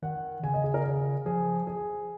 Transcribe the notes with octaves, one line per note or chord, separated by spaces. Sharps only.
D#3 F#5
C#3 G#5
D#5
G#4
A#4
G#4
F3 G#4
G#4